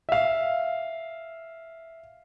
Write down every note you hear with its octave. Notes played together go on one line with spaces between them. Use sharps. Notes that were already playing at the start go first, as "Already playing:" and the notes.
E5 F5